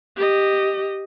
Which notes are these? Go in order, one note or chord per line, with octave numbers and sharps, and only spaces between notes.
G4 D#5